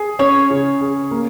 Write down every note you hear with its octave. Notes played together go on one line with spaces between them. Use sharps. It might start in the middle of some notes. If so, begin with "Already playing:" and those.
Already playing: G#4
C#4 C#5
C#3
G#4
A#3